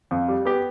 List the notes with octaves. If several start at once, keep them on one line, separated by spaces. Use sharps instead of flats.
F2
G3
B3 G4